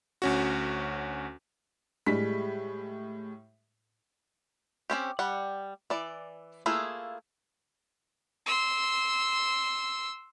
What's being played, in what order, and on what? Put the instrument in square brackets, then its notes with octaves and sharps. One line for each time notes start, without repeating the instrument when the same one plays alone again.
[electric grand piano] D2 C#4 F#4
[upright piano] A2 G3 G#3 B6
[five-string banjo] C4 C#4 G4
G3 F#5
E3 D5
A3 A#3 E4 F4 G#4
[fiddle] C6 E6